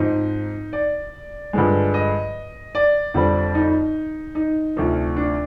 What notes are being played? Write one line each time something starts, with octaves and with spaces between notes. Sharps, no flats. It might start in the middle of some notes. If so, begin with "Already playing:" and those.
Already playing: G#2 F3 C4 D#4
D5
G2 D3 F3 G#3
D#5
D5
F2 D3 G3 C4
D#4
D#4
D2 C3 F3
D4